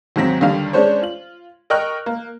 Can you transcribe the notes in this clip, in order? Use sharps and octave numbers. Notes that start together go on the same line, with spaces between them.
D#2 G#2 F#3 C4 A#6 B6
D#2 D3 D#3 G3 F5 F7
G#3 C#4 D4 C5 C#5
F4 F#7
A#4 D#5 G5 C#6 F6 F#6
A#3